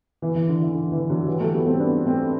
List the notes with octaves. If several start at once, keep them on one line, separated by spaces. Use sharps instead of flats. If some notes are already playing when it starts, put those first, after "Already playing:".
E3
E3
D3
E3
D3
E3
D3 F#3
E3 G3
F#3 A3
G3 B3
A3 C4
B3 D4
A3 C4